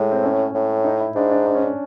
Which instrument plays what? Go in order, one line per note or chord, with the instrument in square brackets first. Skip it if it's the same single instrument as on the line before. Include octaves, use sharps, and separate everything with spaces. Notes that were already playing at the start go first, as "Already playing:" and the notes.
Already playing: [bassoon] A2 [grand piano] G#3
[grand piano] C4
C#4
[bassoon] A2
[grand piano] D#4
E4
[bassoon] G#2 [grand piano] D4
[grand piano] D4
D4
C#4
D4